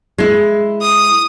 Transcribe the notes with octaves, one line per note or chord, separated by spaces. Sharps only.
G#3 E4
D#6